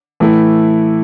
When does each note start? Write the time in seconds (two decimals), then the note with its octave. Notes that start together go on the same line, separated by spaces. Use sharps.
0.20 A2 E3 A3 E4